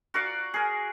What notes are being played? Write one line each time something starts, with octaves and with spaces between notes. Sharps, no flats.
F#4 A#4 D5 F5
G#4 A#4